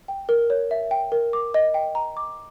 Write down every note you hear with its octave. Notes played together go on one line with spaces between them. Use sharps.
G5
A#4
C#5
E5
G5
A#4
D6
D#5
G5
A#5
D6